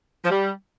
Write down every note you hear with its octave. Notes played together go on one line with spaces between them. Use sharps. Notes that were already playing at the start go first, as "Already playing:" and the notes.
F3
G3